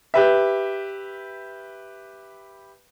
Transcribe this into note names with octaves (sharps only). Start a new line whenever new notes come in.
G4 B4 E5